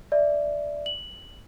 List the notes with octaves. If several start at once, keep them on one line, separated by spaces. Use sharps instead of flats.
D5 E5
F#7